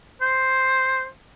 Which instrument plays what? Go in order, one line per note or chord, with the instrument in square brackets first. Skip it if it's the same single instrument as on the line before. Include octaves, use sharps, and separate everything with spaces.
[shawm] C5